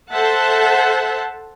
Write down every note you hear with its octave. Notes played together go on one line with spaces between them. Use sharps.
A4 C5 E5 F#5 A5